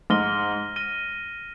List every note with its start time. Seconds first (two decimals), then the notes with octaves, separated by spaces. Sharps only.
0.10 G#2 F6 A#6 D#7 G7
0.76 F6 A#6 D#7 G7